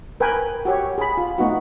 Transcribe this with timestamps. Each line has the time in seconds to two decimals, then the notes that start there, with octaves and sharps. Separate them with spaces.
0.20 A#4 B4 G5 G#5
0.65 F#4 G4 C#5
0.98 G#4 B5
1.18 F4
1.38 A3 B3 D#4 F#4